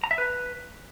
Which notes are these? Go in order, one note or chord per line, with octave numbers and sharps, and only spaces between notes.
A#5
E5
B4